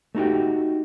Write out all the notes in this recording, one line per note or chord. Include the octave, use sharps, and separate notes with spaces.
A3 D#4 F#4 G4